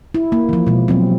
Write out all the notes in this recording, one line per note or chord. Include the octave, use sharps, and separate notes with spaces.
E4
A#3
E3 F3
B2 G#3
F#3 C4